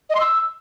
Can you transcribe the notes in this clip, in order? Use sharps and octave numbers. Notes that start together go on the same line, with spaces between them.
D#5
C6
E6